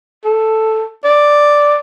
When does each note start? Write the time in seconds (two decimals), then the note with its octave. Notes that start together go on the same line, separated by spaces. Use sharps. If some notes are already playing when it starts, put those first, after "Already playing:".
0.25 A4
1.04 D5